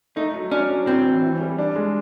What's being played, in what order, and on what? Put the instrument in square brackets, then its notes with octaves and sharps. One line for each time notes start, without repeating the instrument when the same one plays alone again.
[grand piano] A3 [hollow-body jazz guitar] D#4
[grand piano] F#3
[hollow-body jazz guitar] C#4 [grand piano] D4
[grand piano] F#3
[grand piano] A2 [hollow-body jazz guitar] C4
[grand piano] E3
E3
G3
D4
G#3